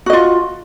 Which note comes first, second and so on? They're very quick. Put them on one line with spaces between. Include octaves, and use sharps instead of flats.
F#4 D#5 F4